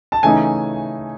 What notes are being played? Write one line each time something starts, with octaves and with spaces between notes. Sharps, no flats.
A5
C#3 E3 A3 D#4 G#5